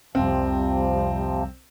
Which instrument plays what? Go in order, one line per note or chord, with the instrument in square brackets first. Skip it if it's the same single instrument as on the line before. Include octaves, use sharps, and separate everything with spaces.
[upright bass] C2 F2 [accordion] C3 F3 [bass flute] G3 [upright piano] C4